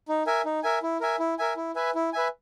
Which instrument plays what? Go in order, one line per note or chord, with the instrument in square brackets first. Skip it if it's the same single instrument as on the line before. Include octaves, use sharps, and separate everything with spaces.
[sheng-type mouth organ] D#4
A#4 E5 G#5
D#4
A#4 E5 G#5
E4
A#4 E5 G#5
E4
A#4 E5 G#5
E4
B4 E5 G#5
E4
B4 E5 G#5